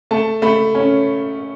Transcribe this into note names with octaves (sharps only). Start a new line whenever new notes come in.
A3 A5
A3 B5
C#4